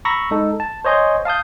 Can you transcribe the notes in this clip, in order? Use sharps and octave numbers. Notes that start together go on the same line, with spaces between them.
A#5 B5 C#6 E6 A#6
G#3 D#4 A4
A5
C5 C#5 D#5 G#5 C6 G6
F5 A5 D#6 G6